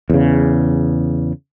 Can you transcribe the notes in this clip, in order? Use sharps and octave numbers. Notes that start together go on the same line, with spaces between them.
E2 C#3